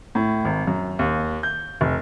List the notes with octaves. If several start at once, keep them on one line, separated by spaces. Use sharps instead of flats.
A2
G#1
F#2
D#2
G6
F1